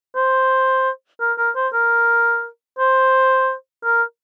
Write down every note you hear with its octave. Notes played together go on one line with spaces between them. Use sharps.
C5
A#4
A#4
C5
A#4
C5
A#4